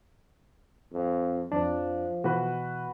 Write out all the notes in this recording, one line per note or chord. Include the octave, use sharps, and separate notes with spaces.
F2
F2 F3 D4
B2 E3 F#4 B4